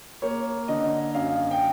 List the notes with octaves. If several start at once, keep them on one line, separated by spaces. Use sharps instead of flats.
A#3 C#5
D3 D#5
F#2 F5
G5